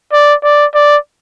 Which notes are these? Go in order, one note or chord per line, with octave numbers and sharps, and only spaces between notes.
D5
D5
D5